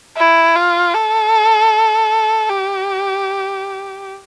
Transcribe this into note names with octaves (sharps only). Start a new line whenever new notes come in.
E4
F4
A4
G4